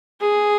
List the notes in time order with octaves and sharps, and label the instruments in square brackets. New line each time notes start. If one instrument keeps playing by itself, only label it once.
[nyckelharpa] G#4